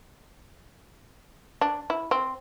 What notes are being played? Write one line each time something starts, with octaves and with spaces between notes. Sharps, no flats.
D4
E4
C4